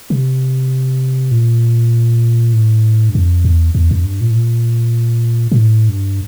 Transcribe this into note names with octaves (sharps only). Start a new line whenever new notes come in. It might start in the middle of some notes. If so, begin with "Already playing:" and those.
C3
A#2
A2
G2
F2
E2
E2
F2
G2
A#2
A2
A#2
A#2
A2
G2